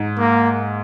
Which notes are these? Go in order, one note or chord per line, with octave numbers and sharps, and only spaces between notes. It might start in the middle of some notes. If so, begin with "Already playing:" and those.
Already playing: G#2
A#3